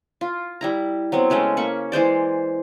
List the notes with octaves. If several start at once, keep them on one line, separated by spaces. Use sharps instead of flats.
F4
G3 E4 A#5
F#3 B3 C4
C#3 G#3 A3 C#4
A#3 C#4 B5 C#6
E3 G#3 C5 D5